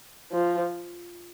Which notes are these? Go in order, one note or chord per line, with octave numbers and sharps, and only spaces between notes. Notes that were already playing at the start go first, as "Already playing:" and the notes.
F3